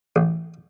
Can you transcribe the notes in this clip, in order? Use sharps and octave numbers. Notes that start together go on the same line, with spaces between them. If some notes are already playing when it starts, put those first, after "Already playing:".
A1